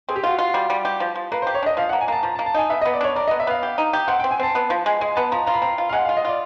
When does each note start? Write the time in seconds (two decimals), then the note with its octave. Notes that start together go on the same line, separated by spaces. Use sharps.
0.09 C4 G#4
0.16 G4
0.23 F4 F#4
0.39 F4
0.54 G3
0.70 G3
0.85 G4
1.00 F3
1.15 F3
1.32 A#3 B4
1.42 C5
1.47 G4
1.54 C#5
1.63 D4 D#5
1.77 F3 F5
1.89 F#5
1.93 A#3
2.01 G#5
2.08 A#3 A5
2.23 F3 A#5
2.35 A5
2.39 A#3
2.46 A5
2.54 D#4 G#5
2.70 B3 E5
2.81 D#5
2.86 B3
2.93 D5
3.01 D4 C#5
3.16 A#4 D5
3.28 D#5
3.31 B3
3.40 E5
3.47 B3 F5
3.63 G4
3.78 D#4
3.93 G4
4.08 C4 F#5
4.20 G5
4.24 C4
4.31 G#5
4.40 C4 A5
4.55 B3
4.70 F3
4.86 G#3
5.00 G#3 G#5
5.16 B3 A5
5.32 F3 A#5
5.46 F4 A#5
5.54 B5
5.62 C4 A#5
5.78 F4
5.89 F5
5.93 G#3 F#5
6.05 F5
6.09 F4
6.17 D#5
6.25 F4 D5